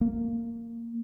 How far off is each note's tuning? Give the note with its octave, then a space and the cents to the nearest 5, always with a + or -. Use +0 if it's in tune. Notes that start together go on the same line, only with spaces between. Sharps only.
A#3 -10